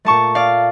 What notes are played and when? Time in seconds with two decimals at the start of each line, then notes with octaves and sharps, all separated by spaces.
0.05 A#2 A3 A5 C#6
0.35 D5 F5